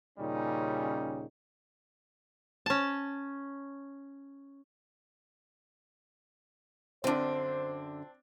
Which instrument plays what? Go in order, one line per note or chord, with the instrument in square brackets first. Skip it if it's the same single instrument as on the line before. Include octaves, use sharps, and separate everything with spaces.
[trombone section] D#2 A#2 C#3 G3 C#4 D#4
[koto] C#4 A5
[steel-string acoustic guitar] F#2 D3 [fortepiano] C4 D4 [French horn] C5